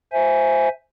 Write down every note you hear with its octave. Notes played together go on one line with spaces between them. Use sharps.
C5 E5 G#5